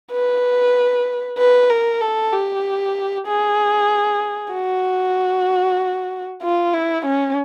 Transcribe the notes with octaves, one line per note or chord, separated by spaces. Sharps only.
B4
B4
A#4
A4
G4
G#4
F#4
F4
E4
C#4